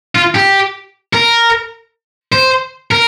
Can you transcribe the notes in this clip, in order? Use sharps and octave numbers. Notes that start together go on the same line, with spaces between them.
F4
G4
A#4
C5
A#4